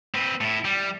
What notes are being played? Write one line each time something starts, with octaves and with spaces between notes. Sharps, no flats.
C4 B4
A2 E4
G3